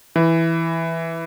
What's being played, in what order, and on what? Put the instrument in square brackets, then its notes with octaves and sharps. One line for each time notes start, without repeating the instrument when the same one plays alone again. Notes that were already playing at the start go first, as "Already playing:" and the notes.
[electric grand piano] E3